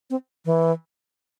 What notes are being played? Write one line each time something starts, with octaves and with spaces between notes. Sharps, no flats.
C4
E3